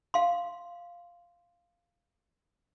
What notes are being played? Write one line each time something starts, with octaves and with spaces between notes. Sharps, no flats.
F5 C6